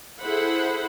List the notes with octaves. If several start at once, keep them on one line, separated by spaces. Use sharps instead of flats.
E4 G#4 A4 C5 F#5 B5